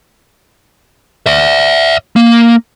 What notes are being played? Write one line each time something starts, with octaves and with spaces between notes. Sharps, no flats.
D5 E5
A#3